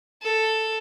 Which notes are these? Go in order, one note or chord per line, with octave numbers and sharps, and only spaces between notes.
A4